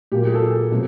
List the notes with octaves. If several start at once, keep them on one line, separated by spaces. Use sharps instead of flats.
A#2 F#3 A#3 G4
G#4
A4
G#4
B2 F#3 A3 C4